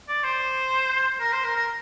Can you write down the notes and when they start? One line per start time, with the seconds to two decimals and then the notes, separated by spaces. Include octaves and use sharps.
0.09 D5
0.24 C5
1.20 A#4
1.32 C5
1.44 A#4
1.56 A#4